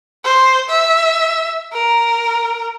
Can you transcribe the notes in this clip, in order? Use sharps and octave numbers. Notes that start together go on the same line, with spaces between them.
C5
E5
A#4